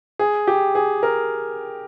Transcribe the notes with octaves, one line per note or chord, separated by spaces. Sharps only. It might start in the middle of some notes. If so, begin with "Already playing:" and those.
G#4
G4
G#4
A#4